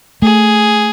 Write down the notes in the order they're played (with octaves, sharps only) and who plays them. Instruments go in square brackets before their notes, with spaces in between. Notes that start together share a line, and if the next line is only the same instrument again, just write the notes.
[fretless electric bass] A3 [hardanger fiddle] G#4